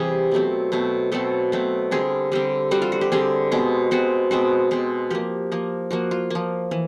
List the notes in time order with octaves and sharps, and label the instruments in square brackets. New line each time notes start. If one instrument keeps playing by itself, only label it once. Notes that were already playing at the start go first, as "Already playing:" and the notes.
Already playing: [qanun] C3 E3 G3 G#4
B2 F#3 A3 C4
B2 F#3 A3 C4
B2 F#3 A3 C4 A4
B2 F#3 A3 C4
D3 G3 C4 G#4
D3 G3 C4
D3 G3 C4 F#4
F4
F#4
G4
D3 G3 C4 G#4
B2 G#3 C4
B2 G#3 C4 F#4
B2 G#3 C4 F#4
B2 G#3 C4
F3 A#3 G4
F3 A#3
F3 A#3 F#4
F4
F3 A#3
E3